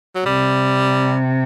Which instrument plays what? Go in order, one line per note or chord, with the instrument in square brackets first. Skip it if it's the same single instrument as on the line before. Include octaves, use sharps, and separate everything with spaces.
[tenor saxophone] F#3
[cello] C3 [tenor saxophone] G3